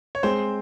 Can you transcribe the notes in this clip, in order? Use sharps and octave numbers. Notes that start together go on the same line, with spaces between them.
C#5
G#3 C4 C5